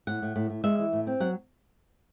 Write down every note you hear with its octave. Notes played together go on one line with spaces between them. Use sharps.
A2 F#5
A2
A2
A2
G#3 E5
E3
A2
C4
F#3 F#5